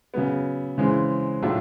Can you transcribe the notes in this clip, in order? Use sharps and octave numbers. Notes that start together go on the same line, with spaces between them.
C#3 F#3 B3
C#3 E3 G#3 C4
A2 F#3 A3 D4 F4